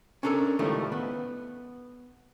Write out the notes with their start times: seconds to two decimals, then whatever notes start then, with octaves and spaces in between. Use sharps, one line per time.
0.23 C#4 D4 A4 A#4 E5
0.59 C#2 A2 D#3 F3 G3 A3
0.92 B3